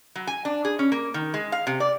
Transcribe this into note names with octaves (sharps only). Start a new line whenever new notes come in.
F#3
G#5
D4
G#4
C#4
A#3
D#3
G#3
F5
C3
D5